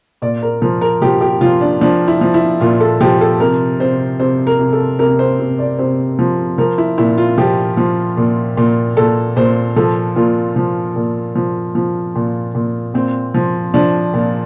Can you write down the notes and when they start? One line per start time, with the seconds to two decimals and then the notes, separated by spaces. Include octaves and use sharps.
0.22 A#2 D5
0.42 A#4
0.62 F3 A#4
0.81 A#4
1.02 F3 G4
1.21 G4
1.41 F3 F4
1.61 D4
1.81 F3 D4
2.08 E4
2.21 F3
2.34 E4
2.61 A#2 F4
2.80 A4
3.01 F3 G4
3.21 A4
3.40 C3 A#4
3.80 C3 C5
4.20 C3 C5
4.47 A#4
4.59 C3
4.73 A4
4.99 C3 A#4
5.19 C5
5.39 C3
5.59 D5
5.79 C3 C5
6.19 F3
6.58 F3 A#4
6.78 E4
6.98 A#2 E4
7.18 F4
7.38 F3 G4
7.77 F3
8.17 A#2
8.57 A#2
8.97 A#2 A4
9.36 A#2 C5
9.76 F3 A4
10.16 A#2 F4
10.56 F3
10.96 A#2
11.35 F3
11.75 F3
12.15 A#2
12.55 A#2
12.94 A#2 C4
13.34 F3
13.74 F3 D4
14.14 A#2